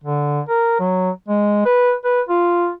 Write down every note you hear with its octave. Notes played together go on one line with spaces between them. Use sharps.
D3
A#4
F#3
G#3
B4
B4
F4